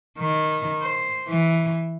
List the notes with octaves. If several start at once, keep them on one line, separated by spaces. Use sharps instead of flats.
D#3
C5
E3